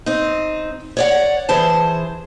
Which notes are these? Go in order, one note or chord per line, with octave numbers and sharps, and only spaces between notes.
C4 D#4
C#5 D5 F#5
E3 G#4 C5 A5